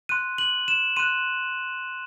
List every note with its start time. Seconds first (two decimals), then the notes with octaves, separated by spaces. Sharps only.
0.09 C6 F#6 D#7
0.38 F#7
0.68 E7
0.96 C6 F#6 D#7